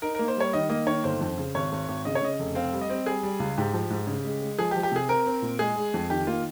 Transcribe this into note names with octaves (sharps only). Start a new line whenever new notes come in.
D#4 A#4
A#3 A#4
C5
G3 C#5
D#3 D#5
A#3 D#5
D#3 C#5
G1 C5
F2
C#3
G#1 C#5
G#1
G#1
C#3 D#5
C#5
C#3 D#5
F1
C4 F5
G3
D#5
C4
G3 G#4
G3
C#2
G#2 G4
F3
G#2
C#3
G#3
G#3
F3 G#4
G4
F3
G4
C3 G#4
C4 A#4
C4
A#2
G#3 G#4
G#3
F2
D#3 G4
A#3 F4